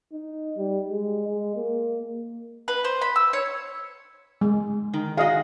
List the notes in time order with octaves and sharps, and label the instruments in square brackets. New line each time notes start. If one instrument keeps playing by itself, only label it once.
[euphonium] D#4
G3
G#3
G#3
A#3
[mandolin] B4
C5
B5
E6
C#5
[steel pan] G#3
[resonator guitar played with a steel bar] D#3
[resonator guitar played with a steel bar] F#4 G#4 [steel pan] D#5 F5